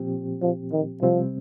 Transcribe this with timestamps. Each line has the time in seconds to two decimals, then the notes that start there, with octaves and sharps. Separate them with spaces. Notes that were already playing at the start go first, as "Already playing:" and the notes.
Already playing: A#2 F3 C4 G4
0.42 F3
0.72 D#3
1.02 C3 F3 G3 C4